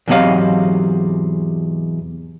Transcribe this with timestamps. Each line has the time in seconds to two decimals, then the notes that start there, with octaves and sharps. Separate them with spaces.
0.08 E2 G#2 C3 F#3 D#5 F5